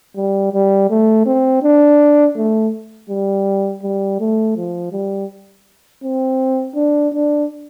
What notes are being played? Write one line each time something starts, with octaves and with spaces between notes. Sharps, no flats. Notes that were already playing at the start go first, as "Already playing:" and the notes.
G3
G3
A3
C4
D4
A3
G3
G3
A3
F3
G3
C4
D4
D4